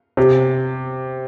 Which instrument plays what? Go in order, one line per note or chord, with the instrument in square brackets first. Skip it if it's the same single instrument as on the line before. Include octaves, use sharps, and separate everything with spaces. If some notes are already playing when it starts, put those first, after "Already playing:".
[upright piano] C3